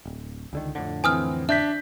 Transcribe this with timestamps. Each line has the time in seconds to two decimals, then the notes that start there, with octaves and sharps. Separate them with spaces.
0.05 D1
0.53 C#2 D3 D#3
0.75 F2 A2 D3
1.04 E3 C4 G#5 D#6 F6
1.49 D4 E5 G6 B6